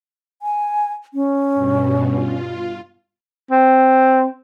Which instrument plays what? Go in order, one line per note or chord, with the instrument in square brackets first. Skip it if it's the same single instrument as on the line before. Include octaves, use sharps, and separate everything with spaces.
[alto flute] G#5
C#4
[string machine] G2 B2
F4
[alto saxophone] C4